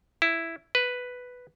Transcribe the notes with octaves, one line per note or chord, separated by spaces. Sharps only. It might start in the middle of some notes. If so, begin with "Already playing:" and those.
E4
B4